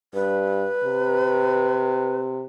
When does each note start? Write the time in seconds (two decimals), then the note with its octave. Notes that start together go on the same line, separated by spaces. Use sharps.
0.14 G2 B4
0.84 C3